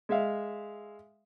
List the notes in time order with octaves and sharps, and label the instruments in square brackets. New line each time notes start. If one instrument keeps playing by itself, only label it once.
[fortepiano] G#3 E5 F5